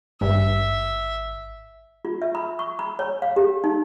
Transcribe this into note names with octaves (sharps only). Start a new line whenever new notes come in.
G#1 G2 E5
F4
E5
B5
C#6
B5
C#5
F5
G4
D#4